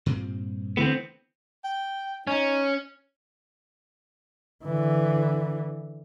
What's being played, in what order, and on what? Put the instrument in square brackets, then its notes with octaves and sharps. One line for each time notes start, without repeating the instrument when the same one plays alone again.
[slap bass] G2 A#2 C4
[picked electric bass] D3 E3 A3 [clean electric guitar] B3 C4
[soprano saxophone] G5
[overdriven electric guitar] C#4 [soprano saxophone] D#4
[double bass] D3 E3